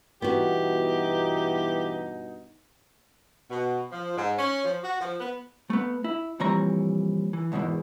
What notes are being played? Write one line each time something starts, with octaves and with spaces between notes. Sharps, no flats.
G2 B2 E3 B3 D#4 F#4 G4
B2
F3
G#2
C#4
F3
F#4
F3
B3
A3 B3
E4
F2 A#2 E3 G3 C#5 A#5
E3
E2 G#2 B2 D#3 E3